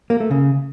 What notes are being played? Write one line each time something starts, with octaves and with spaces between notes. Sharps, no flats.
A#3
A3
C#3